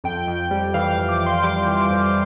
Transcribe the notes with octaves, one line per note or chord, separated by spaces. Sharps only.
F2 G5
F2
G3
E3 F5
F5
F2
D6
F2
C6
G3 D6
E3
F2